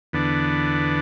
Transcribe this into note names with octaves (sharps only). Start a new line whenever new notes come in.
E2 D3 B3 D4